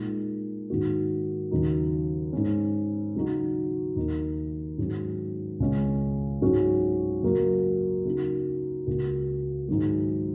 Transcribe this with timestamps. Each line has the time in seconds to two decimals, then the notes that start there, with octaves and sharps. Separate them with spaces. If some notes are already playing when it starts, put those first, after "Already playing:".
Already playing: A#2 G#3 D#4
0.70 G#2 D#3 A#3 F#4
1.51 D#2 C#3 F#3 D#4
2.33 G#2 G#3 C#4
3.15 C#3 F#3 D#4 F#4
3.96 D#2 D#3 A#3 D#4
4.78 G#2 D#3 F#3 C#4
5.60 C#2 C#3 G#3 C#4
6.41 G#2 F#3 C#4 F#4
7.23 F#2 C#3 A#3 F#4
8.05 C#3 A#3 D#4 F#4
8.87 C#2 C#3 A#3 F#4
9.68 G#2 D#3 F#3